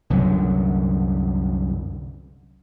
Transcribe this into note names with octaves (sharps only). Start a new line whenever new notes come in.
C2 F#2 D3 F#3